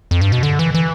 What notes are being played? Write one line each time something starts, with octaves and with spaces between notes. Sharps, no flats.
F2
G2
B2
D3
E3
E3